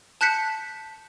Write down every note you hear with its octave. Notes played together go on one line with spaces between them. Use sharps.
A5 F#6 G6 B6 C#7